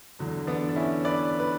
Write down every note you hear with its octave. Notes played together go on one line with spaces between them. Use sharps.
E2 D3 F#3
B3 D4
D4
C#4 E4
B4 D5
B4